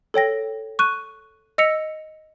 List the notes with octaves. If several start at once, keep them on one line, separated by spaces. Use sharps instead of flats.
A4 C#5 G5 A#6
C#6 F#6 D#7
D#5 E6 A#6 B6 C#7 F7